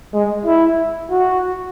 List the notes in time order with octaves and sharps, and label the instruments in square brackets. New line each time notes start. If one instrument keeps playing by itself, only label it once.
[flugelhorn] G#3
E4
F#4